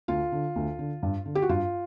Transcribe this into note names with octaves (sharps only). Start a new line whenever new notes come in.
D2 F4
D3
D2
D3
G2
D3
G4
F#4
G2 F4